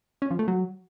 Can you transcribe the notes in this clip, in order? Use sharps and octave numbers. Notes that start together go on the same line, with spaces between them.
C#4
F3
A3
F#3